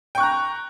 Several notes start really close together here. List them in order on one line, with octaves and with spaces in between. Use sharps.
G5 C#6 F#6 A#5